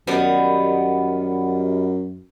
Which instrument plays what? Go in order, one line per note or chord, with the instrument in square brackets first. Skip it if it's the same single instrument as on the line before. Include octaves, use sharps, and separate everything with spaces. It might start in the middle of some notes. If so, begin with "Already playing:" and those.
[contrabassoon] F#2 [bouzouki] D#3 G3 B3